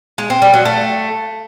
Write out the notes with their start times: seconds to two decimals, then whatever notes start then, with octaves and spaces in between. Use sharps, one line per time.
0.18 G#3
0.30 C4
0.42 G3
0.54 F#3
0.65 A3